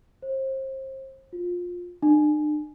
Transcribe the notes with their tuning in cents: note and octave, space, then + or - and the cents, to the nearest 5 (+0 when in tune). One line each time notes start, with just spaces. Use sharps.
C5 +30
F4 +20
D4 +45